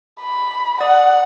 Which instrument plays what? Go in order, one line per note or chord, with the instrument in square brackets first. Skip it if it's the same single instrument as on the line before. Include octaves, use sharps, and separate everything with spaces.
[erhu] B5
[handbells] D5 D#6 [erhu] F#5